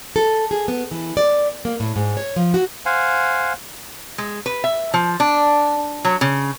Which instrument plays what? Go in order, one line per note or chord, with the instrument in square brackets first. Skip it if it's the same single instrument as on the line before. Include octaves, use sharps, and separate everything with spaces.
[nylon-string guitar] A4
G#4
B3
E3
D5
A#3
A2
G#2
C#5
F3
F#4
[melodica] C5 F5 F#5 G#5
[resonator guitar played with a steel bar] G#3
B4
E5
F3
D4
F#3
C#3